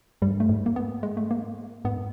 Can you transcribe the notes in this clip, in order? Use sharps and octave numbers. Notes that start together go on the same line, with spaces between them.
G2 G3
A3
G#2
A#3
B3
G#3
A3
A#3
G#2 B3